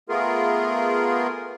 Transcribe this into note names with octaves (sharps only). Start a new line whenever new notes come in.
A3 B3 F4 G#4 A#4